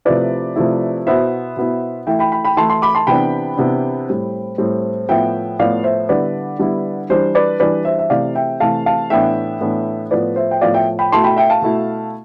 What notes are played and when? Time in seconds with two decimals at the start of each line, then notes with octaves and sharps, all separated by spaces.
0.05 C3 F3 A3 E4 B4 D5
0.56 C3 F3 A3 E4
1.06 B2 B3 E4 C5 E5
1.57 B2 B3 E4
2.07 E3 A3 E4 E5 G5
2.19 G5 B5
2.32 G5 B5
2.45 G5 B5
2.57 E3 A3 E4 A5 C6
2.70 A5 C6
2.82 B5 D6
2.95 A5 C6
3.07 C3 E3 B3 D4 G5 B5
3.57 C3 E3 B3 D4
4.09 A2 G3 C4
4.58 A2 G3 C4
5.09 A2 F3 B3 E5 G5
5.59 A2 F3 B3 D5 F5
5.84 C5 E5
6.09 D3 G3 B3 E4 B4 D5
6.59 D3 G3 B3 E4
7.09 E3 G3 D4 C5
7.35 B4 D5
7.60 E3 G3 D4 B4 D5
7.85 C5 E5
7.99 E5
8.10 C3 E3 A3 D5 F5
8.35 E5 G5
8.60 C3 E3 A3 F5 A5
8.86 F5 A5
9.10 A2 E3 B3 D4 E5 G5
9.61 A2 E3 B3 D4
10.11 A2 F3 B3 B4 D5
10.36 C5 E5
10.51 G5
10.61 A2 F3 B3 D5 F5
10.74 E5 G5
10.99 G5 B5
11.12 B2 A3 E4 A5 C6
11.24 G5 B5
11.37 E5 G5
11.50 F5 A5
11.62 B2 A3 E4